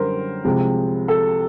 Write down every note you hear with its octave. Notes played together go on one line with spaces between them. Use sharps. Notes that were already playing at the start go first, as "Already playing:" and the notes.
Already playing: F#2 D3 G3 A#4 C5
C2 C3 F3 G#3
A4